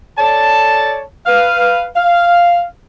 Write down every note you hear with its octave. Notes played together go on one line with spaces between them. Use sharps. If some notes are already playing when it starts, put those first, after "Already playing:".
A4 C#5 D5 A5
B4 F5
F5